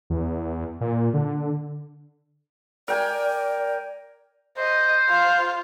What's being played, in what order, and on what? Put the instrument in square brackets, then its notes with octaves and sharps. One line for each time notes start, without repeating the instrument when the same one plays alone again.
[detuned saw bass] E2
A#2
D3
[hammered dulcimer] A#4 G5 G#5 [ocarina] D5
[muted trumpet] C5 [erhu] D#5
[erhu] F4